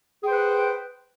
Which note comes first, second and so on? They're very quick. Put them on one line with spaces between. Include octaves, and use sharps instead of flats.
G#4 G5 C5 B4 F#5